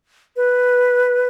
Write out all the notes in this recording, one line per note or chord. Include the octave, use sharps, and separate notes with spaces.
B4